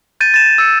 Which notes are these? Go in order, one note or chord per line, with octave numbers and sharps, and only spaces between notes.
G6 A6 D#7
A6 E7
E6 C#7